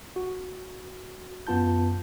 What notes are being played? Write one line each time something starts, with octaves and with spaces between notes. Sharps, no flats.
F#4
F#2 B3 F4 A5 G6